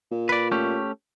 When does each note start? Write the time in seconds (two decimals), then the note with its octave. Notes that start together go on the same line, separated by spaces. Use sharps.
0.11 A#2
0.29 B4 D5
0.52 A3 C#4 G4